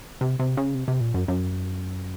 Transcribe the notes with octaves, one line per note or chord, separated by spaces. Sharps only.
C3
C3
C#3
C3
C3
A#2
F#2
F#2